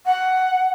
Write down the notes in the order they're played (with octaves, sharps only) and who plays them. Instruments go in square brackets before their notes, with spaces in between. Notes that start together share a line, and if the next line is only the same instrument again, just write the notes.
[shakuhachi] F#5